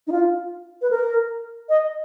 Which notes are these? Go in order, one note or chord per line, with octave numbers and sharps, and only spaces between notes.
D#4
F4
B4
A#4
D#5